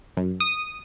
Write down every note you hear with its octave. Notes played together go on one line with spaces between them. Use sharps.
F#2
D#6